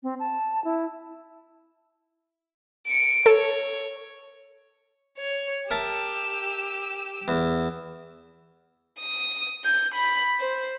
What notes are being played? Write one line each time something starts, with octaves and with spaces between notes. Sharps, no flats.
C4
A5
E4
C#7 D7
A4 C#5
C#5
G4 A#4 E5 A5 E6
E2
D#6
G6
B5
C5